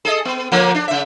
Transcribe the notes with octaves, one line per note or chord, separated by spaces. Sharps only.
G#4 A4 D#5
B3
D3 F3 A#3
D4
C#3 E5